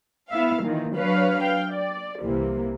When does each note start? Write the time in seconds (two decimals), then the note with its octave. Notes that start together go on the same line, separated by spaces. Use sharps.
0.30 B3 E4 E5 F5
0.64 A#2 D#3 E3
0.97 F#3 D4 B4 C#5 F5
1.42 F5 G5
1.72 D5
2.22 C2 C3 E3 A#3